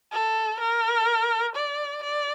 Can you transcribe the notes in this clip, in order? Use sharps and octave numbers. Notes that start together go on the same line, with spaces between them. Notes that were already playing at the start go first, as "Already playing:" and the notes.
A4
A#4
D5
D5